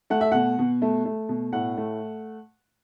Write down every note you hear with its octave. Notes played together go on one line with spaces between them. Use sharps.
A3 F#5
E5
B2 F#5
B2
A3
A3
B2
A2 F#5
A3